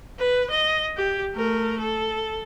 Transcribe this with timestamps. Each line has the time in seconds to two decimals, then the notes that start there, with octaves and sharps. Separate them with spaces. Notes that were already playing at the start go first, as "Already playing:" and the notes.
0.19 B4
0.50 D#5
0.97 G4
1.35 A3 A#4
1.79 A4